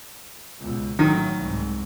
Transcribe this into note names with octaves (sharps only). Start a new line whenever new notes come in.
C#2 B2
A1 D#3 F#3
C2 G#2